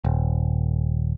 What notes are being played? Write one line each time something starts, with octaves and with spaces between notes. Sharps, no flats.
D#1